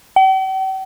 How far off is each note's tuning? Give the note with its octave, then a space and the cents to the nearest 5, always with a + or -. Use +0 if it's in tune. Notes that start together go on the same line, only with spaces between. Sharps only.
G5 -45